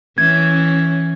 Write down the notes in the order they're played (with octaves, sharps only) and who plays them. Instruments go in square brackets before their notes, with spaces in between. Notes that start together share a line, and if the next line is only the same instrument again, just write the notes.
[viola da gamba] E3 C#4 [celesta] G#6